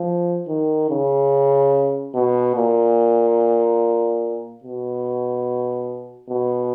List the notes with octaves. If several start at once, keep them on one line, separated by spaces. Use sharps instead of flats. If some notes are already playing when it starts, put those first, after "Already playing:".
Already playing: F3
D#3
C#3
B2
A#2
B2
B2